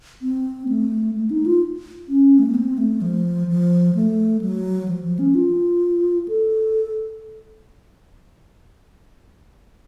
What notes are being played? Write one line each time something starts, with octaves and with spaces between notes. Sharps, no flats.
C4
A3
A3
D#4
F4
C#4
A3
A#3
C4
A3
F3
F3
A3
F#3
F3
F3
C#4
F4
A4